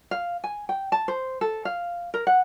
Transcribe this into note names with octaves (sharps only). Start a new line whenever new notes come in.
F5
G#5
G5
A5
C5
A4
F5
A#4
F#5